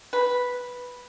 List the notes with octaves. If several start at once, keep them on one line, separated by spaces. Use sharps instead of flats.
B4